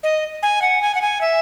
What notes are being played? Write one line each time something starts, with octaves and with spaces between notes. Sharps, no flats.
D#5
G#5
F#5
G#5
F#5
G#5
E5